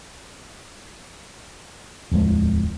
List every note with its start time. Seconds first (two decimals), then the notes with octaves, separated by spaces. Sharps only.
2.11 D1 E2 F3 G#3